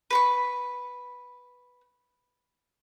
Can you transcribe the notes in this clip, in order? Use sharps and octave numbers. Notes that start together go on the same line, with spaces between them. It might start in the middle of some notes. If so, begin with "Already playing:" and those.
B4 B5 C#6